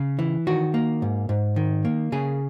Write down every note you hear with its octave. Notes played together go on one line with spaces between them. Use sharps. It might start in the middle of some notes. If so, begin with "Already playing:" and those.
Already playing: C#3
E3
D#3 F#4
A#3
G#2
G#2
D#3
A#3
C#3 G#4